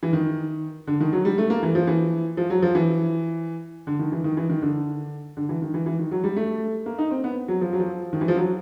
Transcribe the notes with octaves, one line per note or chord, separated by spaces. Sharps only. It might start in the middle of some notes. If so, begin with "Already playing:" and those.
E3
D#3
D3
D#3
F#3
G3
A3
A#3
E3
F3
E3
F3
F#3
F3
E3
D3
D#3
E3
D#3
E3
D#3
D3
D3
E3
D#3
E3
E3
D#3
F#3
G3
A3
A#3
D#4
C4
B3
F#3
F3
F#3
F3
D#3
E3
F3
F#3